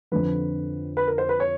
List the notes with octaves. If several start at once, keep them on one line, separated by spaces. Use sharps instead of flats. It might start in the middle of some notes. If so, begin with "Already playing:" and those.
F2 D3 F3 B4
B4
A#4
C5
B4
C#5